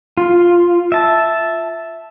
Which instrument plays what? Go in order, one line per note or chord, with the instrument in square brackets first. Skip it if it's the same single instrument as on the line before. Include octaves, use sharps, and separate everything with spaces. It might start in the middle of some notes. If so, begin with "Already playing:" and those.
[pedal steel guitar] F4
E5 A5